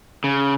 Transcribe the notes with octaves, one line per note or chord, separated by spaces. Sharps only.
C#3